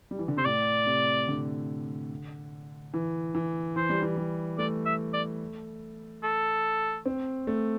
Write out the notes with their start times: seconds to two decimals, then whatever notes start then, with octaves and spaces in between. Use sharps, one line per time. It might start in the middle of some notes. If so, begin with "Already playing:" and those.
0.11 G3
0.19 E3
0.28 D3
0.37 C3 C5
0.45 A2 D5
0.86 C3
1.28 D3
2.94 E3
3.35 E3
3.76 E3 C5
3.89 G3
4.02 E3
4.17 G3
4.58 A3 D5
4.86 E5
5.14 D5
6.24 A4
7.06 C4
7.47 A3